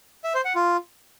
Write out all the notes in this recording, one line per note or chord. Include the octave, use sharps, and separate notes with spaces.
E5
C5
F#5
F4